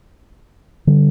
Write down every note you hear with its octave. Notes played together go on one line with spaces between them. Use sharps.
D3 G3